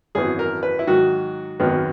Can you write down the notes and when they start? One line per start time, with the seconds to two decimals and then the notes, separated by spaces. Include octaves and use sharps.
0.15 G#1 F#2 E3 B3 G#4
0.39 A#4
0.63 B4
0.79 E4
0.87 G#2 D#3 F#3 F#4
1.60 G#1 F#2 D#3 G#3 B3